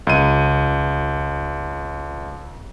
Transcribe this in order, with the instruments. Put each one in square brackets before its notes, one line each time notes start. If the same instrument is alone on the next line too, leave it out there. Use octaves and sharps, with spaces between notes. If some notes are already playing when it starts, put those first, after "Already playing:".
[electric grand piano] C#2 D#7